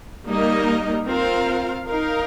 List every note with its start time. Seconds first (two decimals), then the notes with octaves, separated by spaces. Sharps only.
0.28 G3 A#3 D#4 A#4 D#5
1.06 C4 F4 A#4 F5
1.85 D#4 A#4 F5